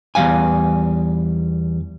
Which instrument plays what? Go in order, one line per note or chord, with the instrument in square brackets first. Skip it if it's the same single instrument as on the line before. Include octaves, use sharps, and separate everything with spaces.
[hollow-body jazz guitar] E2 E3 G3 F5 G#5